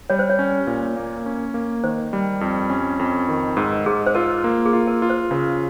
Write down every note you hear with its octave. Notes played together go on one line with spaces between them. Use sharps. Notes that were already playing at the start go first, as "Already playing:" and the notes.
G3 C#5
C5
C#5
C#4
A#2
A#3
C#4
A#3
D#3 C5
G3
F2
C#4
F2
D#3
G#2 A#4
G#2 G#4
C5
F4 A#4
A#3
G#4
F4
A#4
F4
C5
C#3 A#4